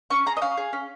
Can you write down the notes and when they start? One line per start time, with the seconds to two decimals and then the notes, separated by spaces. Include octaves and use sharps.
0.10 C#4 C#6
0.26 G#4 A#5
0.37 D#5
0.42 C#4 F5
0.57 G#4
0.73 C#4